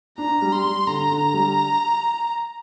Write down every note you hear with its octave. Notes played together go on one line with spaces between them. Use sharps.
D4 A#5
G3
C6
G3
D3 A#5
D3
G3